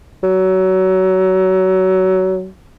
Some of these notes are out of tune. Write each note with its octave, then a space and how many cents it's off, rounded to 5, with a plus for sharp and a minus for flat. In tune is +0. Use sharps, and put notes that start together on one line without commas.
F#3 +25